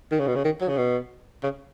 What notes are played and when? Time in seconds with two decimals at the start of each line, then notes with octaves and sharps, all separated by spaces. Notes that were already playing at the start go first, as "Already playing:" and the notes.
0.12 D#3
0.20 C#3
0.27 B2
0.36 C#3
0.45 D#3
0.61 F#3
0.69 C#3
0.77 B2
1.43 C#3